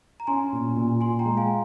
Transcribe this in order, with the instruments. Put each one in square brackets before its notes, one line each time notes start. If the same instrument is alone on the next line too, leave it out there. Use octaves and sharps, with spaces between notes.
[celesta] A#5
[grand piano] C#4 [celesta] G#5 C6
[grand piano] A#2
A#2
[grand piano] F4 [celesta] G#5 C6
[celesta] G5 A#5
[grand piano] G#3
[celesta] F5 G#5